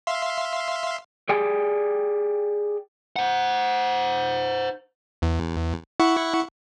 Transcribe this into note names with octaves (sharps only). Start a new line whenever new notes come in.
E5 F5 C6
G4 G#4 D5 G5 G#5
C5 F#5
E2
E4 F#5 C#6